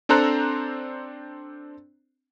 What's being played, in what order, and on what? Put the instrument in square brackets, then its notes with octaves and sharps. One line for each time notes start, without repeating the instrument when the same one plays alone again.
[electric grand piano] C4 D4 A4 C5 A#5 F#6